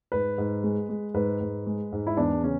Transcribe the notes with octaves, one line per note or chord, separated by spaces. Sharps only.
G#2 B4
G#2
G#3
G#3
G#2 B4
G#2
G#3
G#2
E4
E2 D4
C#3 C#4